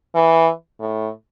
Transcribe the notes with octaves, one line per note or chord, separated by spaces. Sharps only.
E3
A2